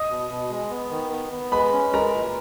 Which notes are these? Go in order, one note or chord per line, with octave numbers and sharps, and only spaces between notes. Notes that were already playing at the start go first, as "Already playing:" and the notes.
Already playing: D#5 D#6
B2
B2
G#3
B3
D#3
B3
B3
G#3 B4 B5
C#4
G#3 A#4 A#5
A#2